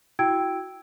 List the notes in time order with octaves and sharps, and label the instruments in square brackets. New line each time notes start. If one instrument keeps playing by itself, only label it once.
[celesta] E4 F#4 G5 E6 G#6 D7